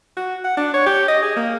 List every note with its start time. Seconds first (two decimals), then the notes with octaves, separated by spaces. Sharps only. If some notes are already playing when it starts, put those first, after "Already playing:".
0.17 F#4
0.44 F#5
0.57 D4
0.74 C#5
0.86 G4
1.08 D#5
1.22 G#4
1.36 A#3